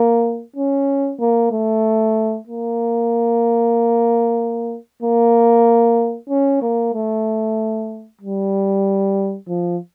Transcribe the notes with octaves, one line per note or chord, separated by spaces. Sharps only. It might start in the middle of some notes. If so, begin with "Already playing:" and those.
Already playing: A#3
C#4
A#3
A3
A#3
A#3
C#4
A#3
A3
G3
F3